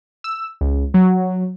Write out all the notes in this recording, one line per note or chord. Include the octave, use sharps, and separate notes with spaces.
E6
C#2
F#3